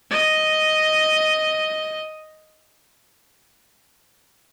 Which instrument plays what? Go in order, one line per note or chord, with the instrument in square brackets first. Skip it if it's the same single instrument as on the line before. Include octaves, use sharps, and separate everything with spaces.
[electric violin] D#5